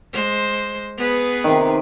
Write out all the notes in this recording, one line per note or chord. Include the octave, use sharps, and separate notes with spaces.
G#3 C5
B3 G#4 B4
C3 D#3